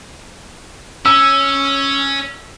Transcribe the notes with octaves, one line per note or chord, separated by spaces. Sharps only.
C#4 E6